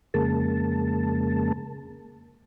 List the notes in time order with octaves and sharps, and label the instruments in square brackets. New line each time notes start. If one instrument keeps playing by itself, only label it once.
[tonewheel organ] F2 C#3 G#3 A#3 A5